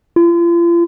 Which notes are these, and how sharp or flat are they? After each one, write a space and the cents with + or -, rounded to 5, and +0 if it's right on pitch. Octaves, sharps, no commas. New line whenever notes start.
F4 -40